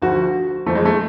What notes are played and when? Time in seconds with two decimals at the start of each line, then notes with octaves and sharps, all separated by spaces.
0.02 D2 D3 F3 F#4
0.66 F2 F3 A3
0.75 G#3
0.85 A3